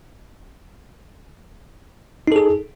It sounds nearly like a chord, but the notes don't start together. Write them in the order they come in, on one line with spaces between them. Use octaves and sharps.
D#4 A4 G#4